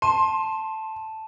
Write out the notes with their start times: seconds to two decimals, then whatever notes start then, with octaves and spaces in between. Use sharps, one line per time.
0.02 A5 C6 D#7 E7